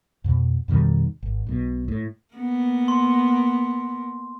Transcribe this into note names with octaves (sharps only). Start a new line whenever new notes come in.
F2 B2
F2 B2 D#3 G3
G#1
B1 B2
A2
A#3 B3
C6